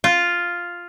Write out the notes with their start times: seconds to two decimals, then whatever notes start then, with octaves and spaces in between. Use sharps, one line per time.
0.04 F4